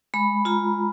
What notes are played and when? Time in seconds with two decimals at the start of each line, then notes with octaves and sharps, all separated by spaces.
0.14 G#3 B5
0.45 F4 A#5